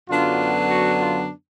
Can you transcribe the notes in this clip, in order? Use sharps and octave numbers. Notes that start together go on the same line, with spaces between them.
F#2 D3 F#3 B3 D4 F4
F#4
F4